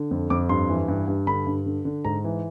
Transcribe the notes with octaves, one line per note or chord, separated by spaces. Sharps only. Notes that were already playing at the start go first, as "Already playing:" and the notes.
Already playing: D3
F2
F2 D6
G2 C6
E3
G2
G2
D3 B5
G2
D3
D3
G#2 A#5
E3